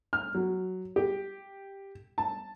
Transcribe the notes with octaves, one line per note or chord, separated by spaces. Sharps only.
F6
F#3
G4
A5